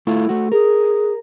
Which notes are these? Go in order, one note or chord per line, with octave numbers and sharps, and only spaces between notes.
A3 E4 F4
A3 F#4
G#4 A#4